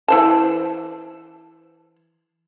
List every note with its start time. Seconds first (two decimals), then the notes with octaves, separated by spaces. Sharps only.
0.08 E3 C5 A5